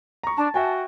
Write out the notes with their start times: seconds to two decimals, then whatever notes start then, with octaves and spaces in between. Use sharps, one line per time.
0.23 A#5 C#6
0.37 D4 A5
0.54 F#4 E5 G5 G#5